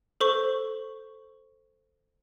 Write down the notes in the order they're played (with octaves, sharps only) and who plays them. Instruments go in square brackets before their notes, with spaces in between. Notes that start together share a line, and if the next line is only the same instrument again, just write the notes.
[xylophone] A4 C5 C#6